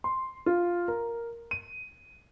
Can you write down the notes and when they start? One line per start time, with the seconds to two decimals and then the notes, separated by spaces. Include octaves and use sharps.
0.04 C6
0.46 F4
0.88 A#4
1.51 D#7